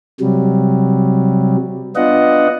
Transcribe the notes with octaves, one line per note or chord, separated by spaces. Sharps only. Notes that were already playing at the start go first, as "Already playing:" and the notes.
C3 F#3 G3
B3 D4 F4 D#5 F#5